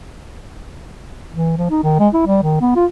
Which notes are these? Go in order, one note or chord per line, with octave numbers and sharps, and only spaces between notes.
E3
F3
D#4
D#3
G#3
E4
G3
D#3
B3
F4